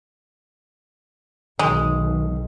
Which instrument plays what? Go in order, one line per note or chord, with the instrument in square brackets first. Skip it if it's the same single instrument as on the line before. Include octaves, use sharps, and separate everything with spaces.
[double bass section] B1 [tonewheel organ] D#3 [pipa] G#3